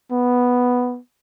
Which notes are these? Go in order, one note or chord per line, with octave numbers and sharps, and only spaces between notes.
B3